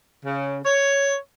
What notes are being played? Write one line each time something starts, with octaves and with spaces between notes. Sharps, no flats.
C#3
C#5